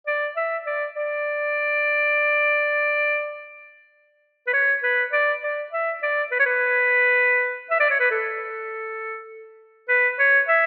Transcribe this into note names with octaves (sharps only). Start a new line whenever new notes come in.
D5
E5
D5
D5
B4
C#5
B4
D5
D5
E5
D5
B4
C#5
B4
E5
D5
C#5
B4
A4
B4
C#5
E5